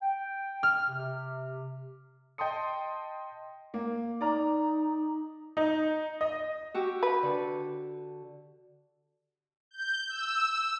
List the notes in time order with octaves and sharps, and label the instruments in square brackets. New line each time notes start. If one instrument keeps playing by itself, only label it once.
[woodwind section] G5
[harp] F6
[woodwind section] C3
[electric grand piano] D#5 G5 A5 C6 D#6 C#7
[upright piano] A#3
[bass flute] D#4 [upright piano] D5 A#5
[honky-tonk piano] D#4
D#5
[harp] F#4 G4 E6
[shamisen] B4
[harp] D3
[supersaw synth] G6
E6